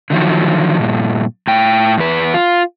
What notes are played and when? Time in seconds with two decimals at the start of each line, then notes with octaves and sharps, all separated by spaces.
0.10 D3 D#3 F3 F#3
0.80 G2 A#2
1.47 A2 G5
1.97 E2 B4
2.34 F4